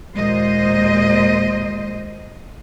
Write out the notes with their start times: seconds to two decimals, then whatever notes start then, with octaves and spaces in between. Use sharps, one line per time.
0.14 D#2 A#2 G#3 C5 D#5